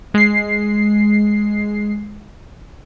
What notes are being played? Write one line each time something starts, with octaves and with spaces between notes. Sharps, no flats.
G#3 C7